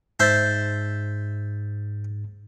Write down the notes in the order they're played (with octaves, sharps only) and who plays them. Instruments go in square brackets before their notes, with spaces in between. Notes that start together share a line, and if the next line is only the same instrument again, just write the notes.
[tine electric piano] G#2 A6 [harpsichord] C5 E5 A5